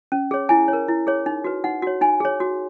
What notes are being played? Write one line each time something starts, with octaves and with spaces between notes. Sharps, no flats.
C#4
G#4 C#5
E4 G#5
A#4 C#5
E4
G#4 C#5
D#4
F#4 B4
D#4 F#5
F#4 C#5
D#4 G#5
G#4 C#5
F#4